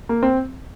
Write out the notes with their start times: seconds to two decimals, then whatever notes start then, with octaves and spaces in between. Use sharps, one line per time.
0.09 A#3
0.23 C4